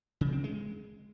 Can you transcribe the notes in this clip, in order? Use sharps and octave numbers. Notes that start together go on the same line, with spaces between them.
C#3
C4
G#3